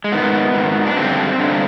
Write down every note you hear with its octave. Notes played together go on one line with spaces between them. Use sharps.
G#3
G#2 D#3 B3
G#2 D#3
D4
G2 D3 C4
G2 D3